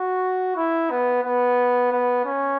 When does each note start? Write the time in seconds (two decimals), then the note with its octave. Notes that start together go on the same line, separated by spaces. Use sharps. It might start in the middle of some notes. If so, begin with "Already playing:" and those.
Already playing: F#4
0.56 E4
0.90 B3
1.23 B3
1.92 B3
2.25 C#4